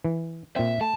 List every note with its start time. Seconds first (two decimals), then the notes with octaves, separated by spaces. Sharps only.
0.05 E3
0.56 A#2 C4 E5
0.81 A3 A5